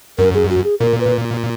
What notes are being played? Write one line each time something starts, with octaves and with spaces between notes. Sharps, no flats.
F#2 A#4
G#4
F#4
G#4
A#2 A#4
B4